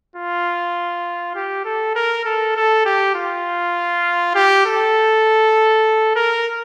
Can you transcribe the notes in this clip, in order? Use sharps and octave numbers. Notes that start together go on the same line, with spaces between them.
F4
G4
A4
A#4
A4
A4
G4
F4
G4
A4
A#4